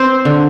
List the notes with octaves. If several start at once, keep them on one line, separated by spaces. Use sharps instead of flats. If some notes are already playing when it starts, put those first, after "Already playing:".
Already playing: C4 C5
D3